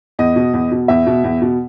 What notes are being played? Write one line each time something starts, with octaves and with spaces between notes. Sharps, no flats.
E2 D#5
B2
E2
B2
E2 E5
B2
E2
B2